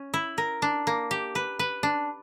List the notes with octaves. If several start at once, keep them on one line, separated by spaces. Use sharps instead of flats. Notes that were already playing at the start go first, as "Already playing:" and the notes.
Already playing: C#4
E4
A#4
D4
A#3
G4
B4
B4
D4